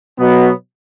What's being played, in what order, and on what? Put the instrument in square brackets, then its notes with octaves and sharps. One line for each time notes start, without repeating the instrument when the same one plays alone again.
[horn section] B2 F#3 B3